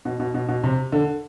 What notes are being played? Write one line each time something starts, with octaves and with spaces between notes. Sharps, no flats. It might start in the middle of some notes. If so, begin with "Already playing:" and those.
B2
B2
B2
B2
C3
D3